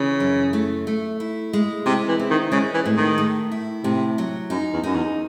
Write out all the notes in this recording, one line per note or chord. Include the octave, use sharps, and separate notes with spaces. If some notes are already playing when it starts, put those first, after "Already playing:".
Already playing: C#3 E3
F#2
A3
A3
E4
G#3
C3 E4
E3
C4
D#3
C#3 G#3
E3
A2
D#3
A2
E4
A2 C3
F#3
F#2 D#4
E2
F#2 D#4
E2